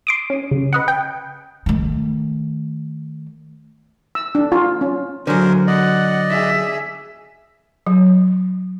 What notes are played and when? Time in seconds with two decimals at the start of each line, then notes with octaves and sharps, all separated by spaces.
0.07 C6 D6 D#6
0.30 C#4
0.51 C#3
0.73 B4 D#5 F#5
0.88 G5
1.66 D#3 A3
4.15 E6
4.35 D4
4.52 F4
4.81 C#4
5.27 D3 F#3 A#4 C5 G#5
5.67 D5 D#5 F#5
6.29 G#4 E5
7.87 F#3